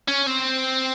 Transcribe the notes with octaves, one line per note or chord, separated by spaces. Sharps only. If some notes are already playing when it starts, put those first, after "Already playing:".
C#4
C4